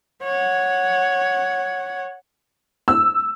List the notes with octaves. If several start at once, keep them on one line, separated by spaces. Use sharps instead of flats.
C#5 F#5
E6